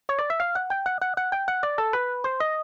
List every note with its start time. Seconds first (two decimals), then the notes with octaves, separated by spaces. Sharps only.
0.09 C#5
0.19 D5
0.30 E5
0.40 F5
0.55 F#5
0.70 G5
0.86 F#5
1.02 F#5
1.17 F#5
1.32 G5
1.48 F#5
1.63 D5
1.78 A4
1.93 B4
2.24 C5
2.40 D#5